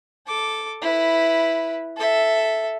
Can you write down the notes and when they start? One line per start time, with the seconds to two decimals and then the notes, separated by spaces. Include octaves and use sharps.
0.27 A4 D6
0.82 E4 B4
1.97 A4 E5